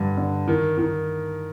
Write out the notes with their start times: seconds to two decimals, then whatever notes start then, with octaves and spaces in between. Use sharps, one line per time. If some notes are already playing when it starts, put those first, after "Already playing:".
Already playing: G2 D3
0.17 D3
0.48 D#3
0.78 D#3